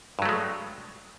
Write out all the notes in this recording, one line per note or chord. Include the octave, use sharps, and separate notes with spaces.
G2 F#3 G#3 A3